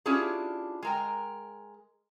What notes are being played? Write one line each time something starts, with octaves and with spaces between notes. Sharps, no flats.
C#4 D4 E4 F4 G4 G#4
G#3 A#4 G5